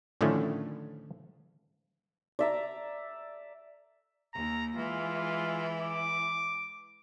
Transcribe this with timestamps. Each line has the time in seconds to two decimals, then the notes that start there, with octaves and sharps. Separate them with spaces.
0.21 A2 D3 D#3 F3 A3 C#4
2.39 D5 E5 A#5
4.34 D#2 A#5
4.75 E3 G#3 F4
5.81 D6